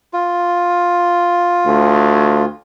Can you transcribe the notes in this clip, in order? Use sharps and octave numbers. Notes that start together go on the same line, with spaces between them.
F4
D2